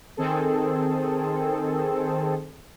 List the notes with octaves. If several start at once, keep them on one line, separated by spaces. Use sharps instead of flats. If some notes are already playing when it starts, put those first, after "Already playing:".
D#3 C4 G#4 A4